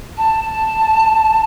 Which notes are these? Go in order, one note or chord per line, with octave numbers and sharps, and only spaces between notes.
A5